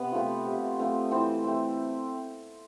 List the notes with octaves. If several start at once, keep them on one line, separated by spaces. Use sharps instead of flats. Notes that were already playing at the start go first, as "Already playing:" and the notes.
Already playing: C3 B3 B4
F3 A3 C4
C3
F3 A3 C4
E3 C4 C5
A3 C4